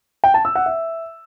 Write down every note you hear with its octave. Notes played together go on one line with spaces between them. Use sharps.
G5
A5
E6
F#5
E5